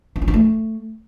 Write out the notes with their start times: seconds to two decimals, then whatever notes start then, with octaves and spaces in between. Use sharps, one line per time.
0.16 D4
0.22 C#4
0.28 D4
0.34 A3